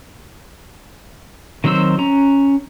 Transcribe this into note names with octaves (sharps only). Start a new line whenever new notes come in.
D#3 F#3 C4 C5 E6
C#4 A#5